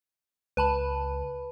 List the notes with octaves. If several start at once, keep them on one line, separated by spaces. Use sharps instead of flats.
C#2 B4 A5 B5